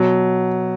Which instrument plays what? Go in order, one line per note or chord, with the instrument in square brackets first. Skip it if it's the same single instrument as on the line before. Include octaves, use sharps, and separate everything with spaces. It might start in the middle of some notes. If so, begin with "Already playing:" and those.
Already playing: [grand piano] B2 F#3